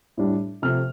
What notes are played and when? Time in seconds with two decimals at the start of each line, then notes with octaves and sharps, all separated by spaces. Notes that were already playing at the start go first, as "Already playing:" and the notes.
0.17 A2 G3 D4
0.62 C3 F3 A3 C4 F6